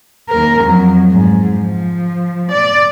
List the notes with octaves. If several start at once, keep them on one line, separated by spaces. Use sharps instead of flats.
D#2 A#4
F2 F#3
G#2
F3
D5